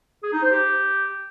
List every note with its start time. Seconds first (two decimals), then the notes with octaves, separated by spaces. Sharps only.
0.23 G#4
0.33 D#4
0.42 C5
0.52 G4